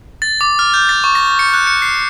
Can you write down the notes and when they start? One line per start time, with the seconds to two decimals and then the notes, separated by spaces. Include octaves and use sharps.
0.22 A6
0.41 D6
0.59 F6
0.74 G6
0.89 A6
1.04 C#6
1.15 A#6
1.39 C#7
1.54 F#6
1.67 C#7
1.82 C7